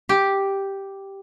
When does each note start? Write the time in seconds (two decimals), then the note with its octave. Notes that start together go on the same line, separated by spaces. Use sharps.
0.09 G4